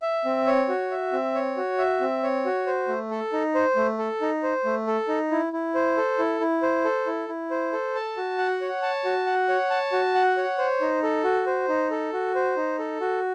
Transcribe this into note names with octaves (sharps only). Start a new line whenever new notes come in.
E5
C4
C#5
F#4
E5
C4
C#5
F#4
E5
C4
C#5
F#4
C5
A3
A4
D#4
C5
A3
A4
D#4
C5
A3
A4
D#4
E4
E4
C5
A4
E4
E4
C5
A4
E4
E4
C5
A4
A5
F#4
F#5
C#5
A5
F#4
F#5
C#5
A5
F#4
F#5
C#5
C5
D#4
A4
F#4
C5
D#4
A4
F#4
C5
D#4
A4
F#4